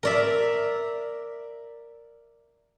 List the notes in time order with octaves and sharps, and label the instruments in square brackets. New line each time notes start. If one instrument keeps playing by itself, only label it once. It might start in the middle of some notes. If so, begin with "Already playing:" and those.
[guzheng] A#4 D5 E5